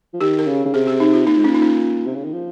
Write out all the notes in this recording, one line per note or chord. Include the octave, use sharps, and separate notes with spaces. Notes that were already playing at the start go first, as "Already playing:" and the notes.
F3
D#3 G4
A#4
C#3
C#3
C3 G#4
G4
D#4
F4
A#2 D#4
G#2
A#2 C#4
D#4
C#4
C3
C#3
D#3
F3